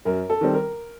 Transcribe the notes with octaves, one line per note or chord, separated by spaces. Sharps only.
F#2 A#4
A4
D#3 G3 C4
A#4